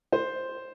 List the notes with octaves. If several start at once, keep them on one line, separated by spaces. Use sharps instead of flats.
C5